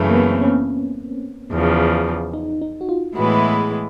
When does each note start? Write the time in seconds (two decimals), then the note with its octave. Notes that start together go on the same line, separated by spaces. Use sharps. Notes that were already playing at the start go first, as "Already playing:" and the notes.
Already playing: F#2 C#3 E3 A3
0.10 A#3
0.15 B3
0.31 C4
0.42 C#4
1.52 E2 C#3 F3
2.34 D#4
2.62 D#4
2.81 F#4
2.89 F4
3.15 A2 E3 G#3 B3 E4 F#4
3.43 G#4